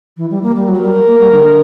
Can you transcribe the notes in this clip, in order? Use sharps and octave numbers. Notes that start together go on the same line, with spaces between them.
E3
G3
A#3
G3
F#3
G3 A#4
A#3
G3
D3